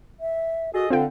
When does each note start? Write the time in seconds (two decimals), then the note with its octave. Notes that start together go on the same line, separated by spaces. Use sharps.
0.20 E5
0.74 F#4 G#4 A4 D#5
0.90 D3 C4 F4 F5 G5